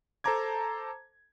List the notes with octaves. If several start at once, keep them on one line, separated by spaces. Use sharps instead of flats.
A4 C5 A5 A#5 D6 G#6